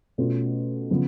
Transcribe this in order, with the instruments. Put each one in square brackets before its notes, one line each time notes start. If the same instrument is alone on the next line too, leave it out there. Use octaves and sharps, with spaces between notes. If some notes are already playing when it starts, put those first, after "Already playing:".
[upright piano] B2 A3 C#4 F4
C#3 F3 B3 F4